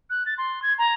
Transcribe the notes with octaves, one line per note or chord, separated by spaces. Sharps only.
F#6
A6
C6
G#6
A#5